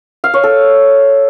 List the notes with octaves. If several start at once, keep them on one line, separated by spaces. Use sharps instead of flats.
F5
C#5
A4